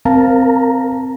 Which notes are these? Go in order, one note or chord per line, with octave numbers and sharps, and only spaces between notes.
C4 A#4 F5 A5 A#5